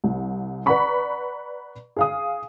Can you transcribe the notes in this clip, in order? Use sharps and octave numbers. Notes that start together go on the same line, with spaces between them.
C2
B4 D5 F#5 A#5 B5 C#6
G#4 F5 D#6